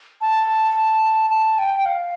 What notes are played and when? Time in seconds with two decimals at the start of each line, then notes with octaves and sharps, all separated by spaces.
0.21 A5
1.30 A5
1.58 G5
1.86 F5